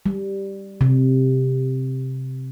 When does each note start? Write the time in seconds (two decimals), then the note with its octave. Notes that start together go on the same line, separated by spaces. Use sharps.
0.06 G3
0.81 C3